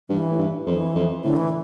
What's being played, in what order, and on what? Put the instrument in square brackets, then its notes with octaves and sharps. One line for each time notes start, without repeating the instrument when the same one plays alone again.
[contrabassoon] G2 [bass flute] E3
[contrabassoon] A2
G2
[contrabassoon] F2 [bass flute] E3
[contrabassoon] F2
[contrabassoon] A2 [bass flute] D3
[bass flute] E3